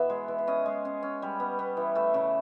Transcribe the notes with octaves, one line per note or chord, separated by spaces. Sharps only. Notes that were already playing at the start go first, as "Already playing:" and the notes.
Already playing: B2 E3 B3 E5
G#3
E3
E5
C#4 D#5
G#3
C#4
C#4
G3
B3
B3
E3
A3 E5
C#3